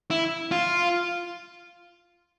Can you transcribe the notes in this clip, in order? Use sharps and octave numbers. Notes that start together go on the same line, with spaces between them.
E4
F4